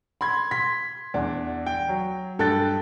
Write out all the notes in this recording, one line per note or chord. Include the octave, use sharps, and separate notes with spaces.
B5 C6 G#6
C6 B6
E2 D4
G5
F#3
G2 A4 G5 F#6 A6